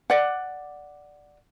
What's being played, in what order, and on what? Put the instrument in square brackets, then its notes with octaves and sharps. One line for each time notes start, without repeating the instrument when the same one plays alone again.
[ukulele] D5 F#5